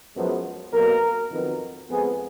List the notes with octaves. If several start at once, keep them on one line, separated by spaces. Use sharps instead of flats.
F#2 F3 G#3 B3
B1 B2 A#3 A#4
F2 D#3 F#3 B3
F2 F3 G#3 B3 G#4